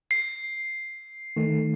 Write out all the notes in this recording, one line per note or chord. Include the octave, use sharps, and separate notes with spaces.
C7
D#3 A3